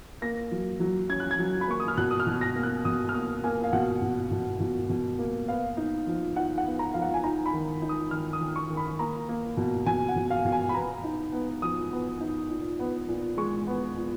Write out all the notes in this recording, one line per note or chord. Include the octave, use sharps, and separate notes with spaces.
A#3 A#6
F#3
F#3
C#4 G#6
F#6
G#6
F#3
B5
A#3 C#6
D#6
F6
B2 F#6
D#6
F6
B2
A#6
A#3
F#6
B2 D#6
F6
A#3 D#6
A#3 G#5
F5
B2 F#5
B2
B2
B2
B2
A#3
B3 F5
D#4
F3
D#4 F#5
F#5
B3
A#5
F3 F5
F#5
G#5
D#4 A#5
B5
D#3
D#4
D#6
D#3 F6
D#6
D#3
C#6
D#3
B5
A#3 A#5
A#3
B2
B2 G#5
F#5
B2
F5
B2
G#5
B5
B3 A#5
D#4
B3
F3 D#6
B3
D#4
A#2
B3
A#2
G#3 C#6
B3
A#2